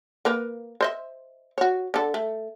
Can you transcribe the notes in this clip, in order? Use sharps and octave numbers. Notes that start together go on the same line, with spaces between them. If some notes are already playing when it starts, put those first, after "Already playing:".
A#3 A#4 B4
C5 D#5 E5
F#4 C#5
D3 A4
A3